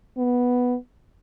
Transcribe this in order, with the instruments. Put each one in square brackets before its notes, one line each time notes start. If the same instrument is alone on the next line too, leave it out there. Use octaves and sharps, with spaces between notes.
[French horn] B3